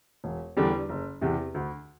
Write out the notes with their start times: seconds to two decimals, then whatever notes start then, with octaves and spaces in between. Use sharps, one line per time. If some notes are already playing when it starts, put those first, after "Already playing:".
0.24 E1
0.57 E2 D3 G3 D4
0.89 F#1
1.21 E2 C3
1.54 D2